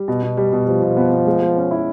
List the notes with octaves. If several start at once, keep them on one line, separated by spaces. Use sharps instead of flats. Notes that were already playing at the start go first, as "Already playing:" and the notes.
Already playing: G3
B2
B2
G3
B2
F3 G3
B2
B3
B3
G#3
G#3
C#4
E4